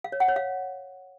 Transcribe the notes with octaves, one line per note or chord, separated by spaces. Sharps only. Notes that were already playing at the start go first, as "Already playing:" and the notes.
F5
C#5
F#5
C#5
F5